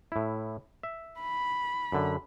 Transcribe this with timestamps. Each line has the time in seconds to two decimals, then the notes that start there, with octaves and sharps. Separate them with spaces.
0.12 A2 E4
0.83 E5
1.20 B5
1.92 F#2 D3